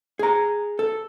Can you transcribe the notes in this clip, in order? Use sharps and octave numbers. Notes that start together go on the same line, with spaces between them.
G#4 A#5
A4